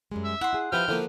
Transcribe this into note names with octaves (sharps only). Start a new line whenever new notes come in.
F#2 G3 G#3
E5
E4 F#5 C6
E4 G#4
F3 E4 G4 B4 G5 F6
D3 F3 A#3 E4